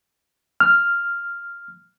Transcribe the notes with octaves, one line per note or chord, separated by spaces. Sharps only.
F6